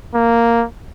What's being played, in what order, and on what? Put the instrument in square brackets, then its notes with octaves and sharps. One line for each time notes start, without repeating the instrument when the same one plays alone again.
[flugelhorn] A#3